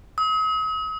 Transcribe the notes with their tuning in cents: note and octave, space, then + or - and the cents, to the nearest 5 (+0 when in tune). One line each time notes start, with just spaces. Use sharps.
D#6 +45